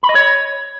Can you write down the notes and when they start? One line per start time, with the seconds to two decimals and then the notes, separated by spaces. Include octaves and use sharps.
0.03 B5
0.09 D#5
0.15 C#5